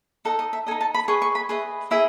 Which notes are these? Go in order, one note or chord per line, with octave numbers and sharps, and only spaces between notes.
D#4 A4 D#5 F#5
D#5
E5
D#4 A4 D#5 G#5
A5
B5
G#4 B4 D#5 C#6
C#6
B5
G#4 B4 D#5 E5
E4 G#4 D#5 E5